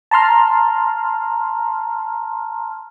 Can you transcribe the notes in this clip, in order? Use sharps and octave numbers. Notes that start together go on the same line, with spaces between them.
A5 A#5 C6 F6